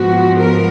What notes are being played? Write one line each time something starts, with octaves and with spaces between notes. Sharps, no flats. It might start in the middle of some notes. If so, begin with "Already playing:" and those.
Already playing: G#2 F3 B3 F#4
A#4